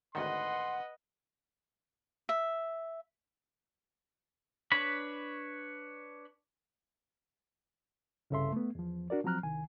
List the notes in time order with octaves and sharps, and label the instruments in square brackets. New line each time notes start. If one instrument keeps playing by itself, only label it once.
[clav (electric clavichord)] G#1 D2 D#3 [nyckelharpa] B4 D#5 [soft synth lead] F#5 [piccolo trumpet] C6
[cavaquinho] E5
[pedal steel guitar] D4 B4 C#5 B5
[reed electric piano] C2 G2 C#3 A4 E5 C6
A3 B3
E2 F3
D4 F#4 A#4 D5
F3 F#3 C4 A#5 F6 F#6
C2 D#3 G#5